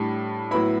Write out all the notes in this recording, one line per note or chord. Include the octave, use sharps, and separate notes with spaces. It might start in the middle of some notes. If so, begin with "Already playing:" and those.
Already playing: A2 G3 D4 A5
A2 F#3 B3 E4 B5